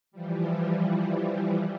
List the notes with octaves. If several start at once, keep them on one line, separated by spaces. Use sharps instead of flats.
E3 F3 G3